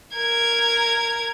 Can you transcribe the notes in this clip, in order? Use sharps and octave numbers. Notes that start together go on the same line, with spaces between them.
A#4 G#6